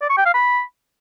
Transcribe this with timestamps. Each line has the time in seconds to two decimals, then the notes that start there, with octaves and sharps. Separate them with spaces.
0.02 D5
0.10 C#6
0.18 G5
0.26 F5
0.34 B5